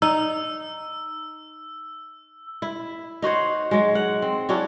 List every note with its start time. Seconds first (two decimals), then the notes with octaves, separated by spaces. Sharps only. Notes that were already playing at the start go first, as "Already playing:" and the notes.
0.02 D#4 E6
2.62 E4
3.22 D#4 F#4 C5 C#5
3.71 F#3 G#3
3.95 F#5
4.22 C4
4.49 F#3 C#4 D4 E4